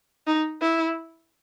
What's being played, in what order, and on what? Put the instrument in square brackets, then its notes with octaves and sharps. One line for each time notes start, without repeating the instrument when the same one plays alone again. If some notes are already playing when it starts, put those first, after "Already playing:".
[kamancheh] D#4
E4